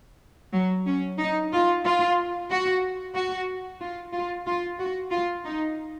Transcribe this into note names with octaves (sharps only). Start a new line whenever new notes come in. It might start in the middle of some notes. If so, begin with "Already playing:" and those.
F#3
C#4
D#4
F4
F4
F#4
F#4
F4
F4
F4
F#4
F4
D#4